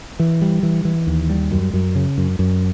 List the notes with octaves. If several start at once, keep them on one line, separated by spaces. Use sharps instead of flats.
E3
G3
E3
E3
D#2
G3
F#2
F#2
C#3
F#2
F#2